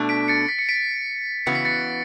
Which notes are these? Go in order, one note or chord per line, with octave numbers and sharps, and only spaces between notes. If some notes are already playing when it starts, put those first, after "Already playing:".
Already playing: B2 A3 D4
B6 D7
A6 C#7
B6
C#7
B6 D7
C#3 E3 B3 F#4 C#7
B6
A6 C#7